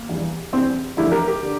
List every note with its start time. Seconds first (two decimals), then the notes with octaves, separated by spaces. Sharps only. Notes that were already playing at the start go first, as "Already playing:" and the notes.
Already playing: A#3
0.09 E2 E3 G3
0.52 E2 E3 G3 C4
0.97 E2 D3 F3 A3 E4 G4
1.12 G4 A#4
1.28 G4 A#4
1.43 D3